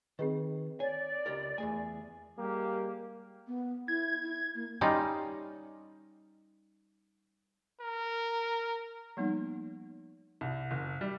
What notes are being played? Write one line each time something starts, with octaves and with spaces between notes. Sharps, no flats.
D#3 C4 G#4 B4
C#5 D5 G#5
C#2 G4 A#4
E2 A3 G#4 G#5
G3 G#3 A#3 G4
B3
E4 G#6
E4
A#3
G3 C#4 D#4 F4
A#4
F3 G3 A#3 B3 D#4
C2
F#1
G3